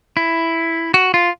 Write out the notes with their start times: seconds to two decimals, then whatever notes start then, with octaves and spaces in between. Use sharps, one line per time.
0.17 E4
0.94 F#4
1.14 F4